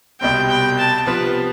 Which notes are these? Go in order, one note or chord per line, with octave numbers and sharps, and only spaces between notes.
C2 B2 G3 C4 G5
G5
A5
C3 F3 B3 B4